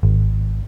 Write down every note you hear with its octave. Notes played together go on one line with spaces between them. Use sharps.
G#1